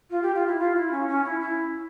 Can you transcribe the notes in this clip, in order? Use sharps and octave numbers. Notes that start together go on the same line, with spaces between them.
F4
G4
F4
E4
F4
E4
C#4
C#4
E4
E4